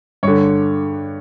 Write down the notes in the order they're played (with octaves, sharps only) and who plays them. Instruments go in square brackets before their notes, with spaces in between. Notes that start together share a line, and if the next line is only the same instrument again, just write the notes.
[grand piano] G2 D3 C#5